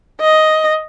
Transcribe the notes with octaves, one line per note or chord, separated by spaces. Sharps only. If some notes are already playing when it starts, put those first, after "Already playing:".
D#5